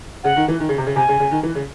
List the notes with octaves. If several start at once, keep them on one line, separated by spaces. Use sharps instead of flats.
C#3 F#5
D#3
E3
D#3
C#3
C3
C#3
C3 G#5
C#3
C#3
D#3
E3
C#3